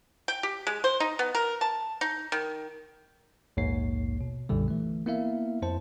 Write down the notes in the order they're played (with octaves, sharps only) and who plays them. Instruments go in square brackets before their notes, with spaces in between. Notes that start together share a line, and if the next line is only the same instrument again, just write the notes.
[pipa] G5
G4
G#3
C5
D#4
B3
A#4
A5
D#4
D#3
[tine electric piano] A#1 D#2 G#2 A#3 C#5 C7
B2
B1 F#2 A#2 D3 G3
E3 A3
A#3 B3 E4 A#4 E5 F5
F2 E4 C5 A5